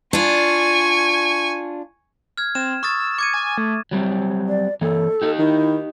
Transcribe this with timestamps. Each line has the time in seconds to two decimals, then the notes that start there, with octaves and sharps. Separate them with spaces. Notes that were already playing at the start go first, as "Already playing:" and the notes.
0.13 D4 F4 G#5 C#6
2.38 F6 G#6
2.55 C4 E7
2.83 C#6 D#6 E6 A6
3.18 D6 G#6 C#7 D#7
3.34 G#5
3.58 A3
3.91 F#3 G3 C4
4.48 D5
4.81 E3 A#3 A4
5.22 D#4 G4
5.39 D#3 E4